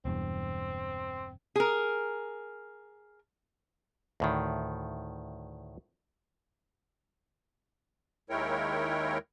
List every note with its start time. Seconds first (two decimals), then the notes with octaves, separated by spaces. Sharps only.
0.05 E1 E2 G2 C4
1.56 G#4 A#4
4.20 D2 A2 D#3
8.30 D#2 G#3 E4 A#4 C#5 G5